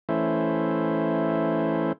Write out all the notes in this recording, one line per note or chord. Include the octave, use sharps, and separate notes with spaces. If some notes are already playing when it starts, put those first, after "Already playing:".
E3 A3 C#4 E4 C5